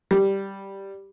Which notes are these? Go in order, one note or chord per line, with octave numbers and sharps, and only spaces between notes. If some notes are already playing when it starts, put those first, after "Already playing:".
G3